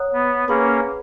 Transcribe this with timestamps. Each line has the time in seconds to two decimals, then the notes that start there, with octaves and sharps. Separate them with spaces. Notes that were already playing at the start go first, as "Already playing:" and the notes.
Already playing: C#5 F#5 A#5 D#6 F#6
0.13 B3
0.48 A#3 C#4 G#4 B4 F#5 B5